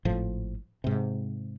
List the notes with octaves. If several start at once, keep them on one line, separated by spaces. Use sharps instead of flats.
G#1 A2 F3
G#2 C3